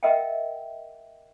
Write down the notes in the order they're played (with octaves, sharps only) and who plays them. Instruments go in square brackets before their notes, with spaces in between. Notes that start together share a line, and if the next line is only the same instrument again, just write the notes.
[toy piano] A#4 D#5 E5 F#5 G5